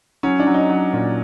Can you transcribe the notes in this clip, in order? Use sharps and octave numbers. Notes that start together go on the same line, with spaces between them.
F#3 C#4
D4
F#3
D#4
F#3
A#2